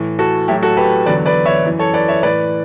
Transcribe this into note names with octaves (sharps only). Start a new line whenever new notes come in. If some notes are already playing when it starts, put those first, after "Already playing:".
Already playing: A2 E3
F#4 A4
A2 F#3 E4 G4
F#4 A4
G4 B4
E2 D3 F#3 B4 D5
B4 D5
C#5 E5
F#2 E3
A4 C#5
B4 D5
C#5 E5
A2 E3 B4 D5